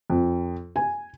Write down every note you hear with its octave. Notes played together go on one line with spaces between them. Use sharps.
F2
G#5